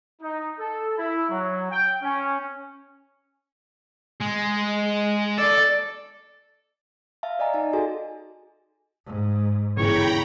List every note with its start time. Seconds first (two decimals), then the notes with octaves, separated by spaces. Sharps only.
0.22 D#4
0.59 A4
0.97 E4
1.30 F#3
1.71 G5
2.02 C#4
4.20 G#3
5.38 A4 D5
7.23 E5 F5 A5
7.39 D5 D#5 G#5 A#5
7.54 D#4 A5
7.73 F#4 G#4 A4 G#5
9.06 G#2
9.77 G1 C#3 E3 C#5 G5 A#5 B5